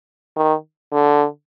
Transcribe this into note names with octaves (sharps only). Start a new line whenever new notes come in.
D#3
D3